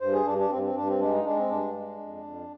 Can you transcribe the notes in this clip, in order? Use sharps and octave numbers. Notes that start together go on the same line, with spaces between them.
G2 C5
G#4
G2 D4
D4
G2 C4
C4
G2 D4
C4
G#3 D4
D#4
G#3 D4
C4
G2 D4
G#3
F2
F2